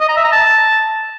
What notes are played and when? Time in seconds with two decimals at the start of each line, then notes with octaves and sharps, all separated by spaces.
0.01 D#5
0.09 A#5
0.16 E5
0.24 A#5
0.32 A5